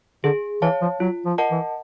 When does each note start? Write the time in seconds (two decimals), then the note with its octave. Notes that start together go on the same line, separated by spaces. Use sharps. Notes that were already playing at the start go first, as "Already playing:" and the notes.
0.24 D3 G#4
0.62 E3 C#5 F5 A5
0.81 F3
1.00 F#3 F4
1.25 F3
1.38 A#4 D#5 F#5 A5
1.51 E3